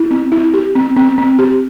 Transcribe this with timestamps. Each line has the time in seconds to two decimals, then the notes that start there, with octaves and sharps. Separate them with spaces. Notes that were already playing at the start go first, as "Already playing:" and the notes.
Already playing: E4
0.11 C4
0.32 E4
0.54 G4
0.75 C4
0.97 C4
1.18 C4
1.39 G4